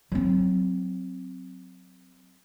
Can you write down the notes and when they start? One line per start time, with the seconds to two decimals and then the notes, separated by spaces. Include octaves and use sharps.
0.12 F#3 C4